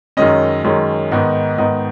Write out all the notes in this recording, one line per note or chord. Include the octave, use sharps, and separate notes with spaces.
F#2 D#3 G#3 C#4 D#5
F#2 D#3 G#3 C#4
G#2 D#3 B3 D#4
G#2 D#3 B3 D#4 D#5